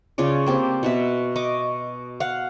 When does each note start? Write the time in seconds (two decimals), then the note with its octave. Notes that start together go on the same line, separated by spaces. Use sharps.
0.18 C#3 F4 C#5 D5
0.46 A#3 C4 G4
0.83 B2 F#4 E5
1.36 D#5 C#6 D6
2.20 F5 F#5